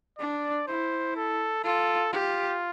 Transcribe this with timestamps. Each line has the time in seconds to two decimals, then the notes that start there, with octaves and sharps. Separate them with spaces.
0.19 D4 D5
0.68 E4 C5
1.16 A4
1.64 F4 A4
2.12 F4 G4